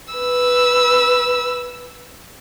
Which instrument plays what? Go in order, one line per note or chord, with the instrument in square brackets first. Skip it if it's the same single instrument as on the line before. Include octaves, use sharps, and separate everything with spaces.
[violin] B4 E6